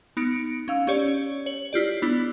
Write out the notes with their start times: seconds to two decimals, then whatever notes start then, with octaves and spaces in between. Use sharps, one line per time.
0.17 B3 D#4 C#7 D7
0.68 C#4 F5 E6
0.87 C#4 G4 C#5 D5
1.46 C#5 F#7
1.73 E4 F4 G4 D5
2.02 B3 D4 E4